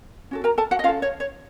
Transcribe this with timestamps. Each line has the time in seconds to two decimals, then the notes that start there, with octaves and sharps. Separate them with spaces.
0.31 C#4 F#4 A4
0.44 A#4 A#5
0.58 A4 A5
0.71 F#4 F#5
0.79 D#5
0.84 C#4 F4 A4 F5
1.02 C#5
1.20 C#5